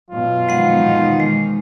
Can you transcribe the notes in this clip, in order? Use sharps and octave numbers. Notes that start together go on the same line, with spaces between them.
F#2 B2 F4
D#3 F3 G#3 B3 D#4 F#5
E2 B2
G#3